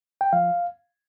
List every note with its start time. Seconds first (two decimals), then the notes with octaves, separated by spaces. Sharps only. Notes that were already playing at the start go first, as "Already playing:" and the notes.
0.21 G5
0.33 F3 F5